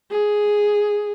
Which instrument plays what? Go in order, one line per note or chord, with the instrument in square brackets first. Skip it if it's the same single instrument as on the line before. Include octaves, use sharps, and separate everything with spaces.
[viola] G#4